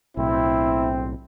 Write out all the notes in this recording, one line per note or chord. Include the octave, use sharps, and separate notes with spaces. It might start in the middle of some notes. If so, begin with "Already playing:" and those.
B1 A2 C4 E4